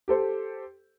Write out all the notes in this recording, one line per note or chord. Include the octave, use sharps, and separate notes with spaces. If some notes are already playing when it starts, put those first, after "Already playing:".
G4 A4 C5